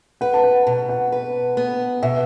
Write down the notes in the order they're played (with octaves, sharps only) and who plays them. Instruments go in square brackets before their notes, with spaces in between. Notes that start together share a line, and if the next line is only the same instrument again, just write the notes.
[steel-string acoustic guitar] B4 [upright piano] F#5
[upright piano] A5
F#5
[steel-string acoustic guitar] B2 [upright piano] A5
[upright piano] F#5
[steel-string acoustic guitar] B4
B3
[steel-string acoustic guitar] B2 [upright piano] E5